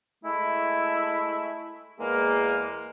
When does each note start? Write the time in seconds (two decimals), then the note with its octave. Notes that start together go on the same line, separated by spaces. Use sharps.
0.24 G#3 A3 E4
1.99 E2 G#3 A#3